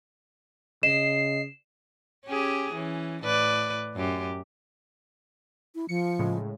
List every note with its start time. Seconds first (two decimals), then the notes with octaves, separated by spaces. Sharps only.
0.83 C#3 D#5 C7 E7
2.27 C#4 G4 G#4
2.73 E3 C#4
3.23 A2 B4 D5
3.96 F#2 G4
5.75 E4
5.89 F3 C#7
6.19 A2 C#3 G#3